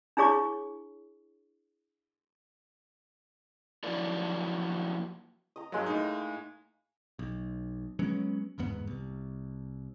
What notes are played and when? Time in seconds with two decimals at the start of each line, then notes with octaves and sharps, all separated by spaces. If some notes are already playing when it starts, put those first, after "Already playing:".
0.17 D4 E4 G#4 C#5 C#6 D6
3.83 F3 F#3 A#3 E4 A#4 D5
5.56 D#5 A#5
5.72 G2 F#3 G#3 A#3
5.86 A2 D#4
7.19 B1
7.99 F#3 G#3 B3 C#4
8.58 G1 E2 G#2 B3
8.87 C2